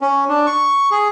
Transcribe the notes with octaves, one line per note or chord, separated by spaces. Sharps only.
C#4
D4
C#6
G#4